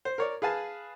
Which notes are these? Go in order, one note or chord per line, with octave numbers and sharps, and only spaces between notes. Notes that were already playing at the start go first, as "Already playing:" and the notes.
C5
A#4 C#5 D5
G#4 B4 F5 G#5 A5